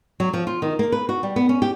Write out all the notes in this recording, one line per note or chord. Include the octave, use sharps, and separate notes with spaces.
F#3
F3
F4
D#3
A#3
B4
F#4
G3
B3
C#4
G4